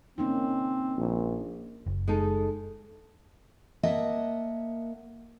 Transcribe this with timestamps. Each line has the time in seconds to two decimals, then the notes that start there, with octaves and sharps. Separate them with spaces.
0.18 A#3 C4 C#4 D#4
0.98 A#1
1.86 F#1
2.08 G#3 D#4 A4
3.83 A#3 D#5 E5 F#5 A5